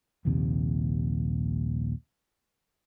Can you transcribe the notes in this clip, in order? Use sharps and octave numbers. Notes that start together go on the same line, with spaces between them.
D#1 A#1 D#2 C3